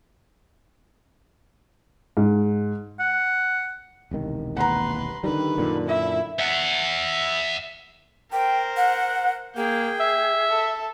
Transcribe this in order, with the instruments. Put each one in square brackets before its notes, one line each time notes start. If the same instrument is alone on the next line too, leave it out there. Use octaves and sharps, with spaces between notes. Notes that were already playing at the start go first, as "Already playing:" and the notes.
[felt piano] G#2
[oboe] F#5
[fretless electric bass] E1 C2 D#3
[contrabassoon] D#2 [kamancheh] B4 C6 [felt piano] F#5 A#5
[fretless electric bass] D3 G3 [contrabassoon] D#3 [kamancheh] B4
[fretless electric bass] F#2 A#2 D3
[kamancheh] E4 E5
[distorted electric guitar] E5 F#5
[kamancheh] A#4 C5 [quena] G5
[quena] F#5
[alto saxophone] A#3 [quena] G#4 [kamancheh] G5
[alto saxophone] E5
[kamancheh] A4